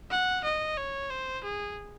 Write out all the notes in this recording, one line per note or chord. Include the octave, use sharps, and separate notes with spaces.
F#5
D#5
C#5
C5
G#4